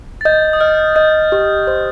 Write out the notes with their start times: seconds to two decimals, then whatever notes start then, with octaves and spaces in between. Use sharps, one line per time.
0.21 A6
0.25 D#5 G6
0.53 D#6
0.60 D#5 F6
0.96 D#5 G6
1.32 G4
1.67 C5